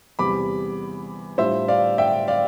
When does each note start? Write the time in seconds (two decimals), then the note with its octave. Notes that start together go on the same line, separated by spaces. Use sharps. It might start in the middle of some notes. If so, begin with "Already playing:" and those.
0.19 E2 C3 G3 B5 D6
1.38 A2 G3 D4 F4 C5 E5
1.68 D5 F5
1.98 E5 G5
2.28 D5 F5